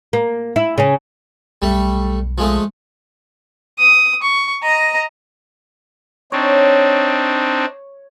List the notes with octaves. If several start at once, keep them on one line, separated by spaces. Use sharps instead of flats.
A#3
E4
C#3 C#4
B1 G3 A3
F3 G#3 A3
D#6
C#6
D#5 A#5
C4 D4 D#4 C#5